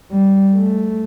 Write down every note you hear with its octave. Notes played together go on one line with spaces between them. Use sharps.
G3
A3